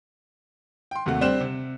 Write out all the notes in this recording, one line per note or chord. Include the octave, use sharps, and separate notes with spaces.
G5 C6
D#2 C3 A3 F#4 F#5
G3 C4 D4 C5 F#6 E7
C3